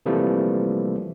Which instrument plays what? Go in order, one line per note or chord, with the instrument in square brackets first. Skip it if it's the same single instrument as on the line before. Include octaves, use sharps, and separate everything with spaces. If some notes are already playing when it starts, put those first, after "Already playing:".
[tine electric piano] C3 E3 F3 G3 A3 A#3